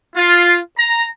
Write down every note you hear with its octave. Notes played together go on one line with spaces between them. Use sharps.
F4
A#5